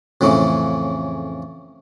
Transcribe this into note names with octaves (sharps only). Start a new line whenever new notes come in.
F2 A2 C#3 E3